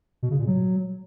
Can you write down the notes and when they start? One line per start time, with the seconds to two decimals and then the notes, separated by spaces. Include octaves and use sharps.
0.23 B2
0.31 C#3
0.39 A#2
0.47 F#3